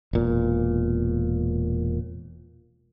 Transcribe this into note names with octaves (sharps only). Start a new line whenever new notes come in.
E1 A#2